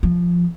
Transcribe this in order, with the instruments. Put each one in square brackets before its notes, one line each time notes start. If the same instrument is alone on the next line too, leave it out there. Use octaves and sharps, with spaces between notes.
[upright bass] F3